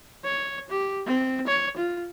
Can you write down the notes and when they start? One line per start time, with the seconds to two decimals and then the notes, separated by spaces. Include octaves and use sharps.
0.24 C#5
0.70 G4
1.06 C4
1.47 C#5
1.77 F4